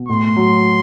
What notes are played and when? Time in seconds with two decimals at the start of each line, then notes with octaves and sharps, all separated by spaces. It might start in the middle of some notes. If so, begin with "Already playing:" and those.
Already playing: B2
0.08 A2 C6
0.36 F#3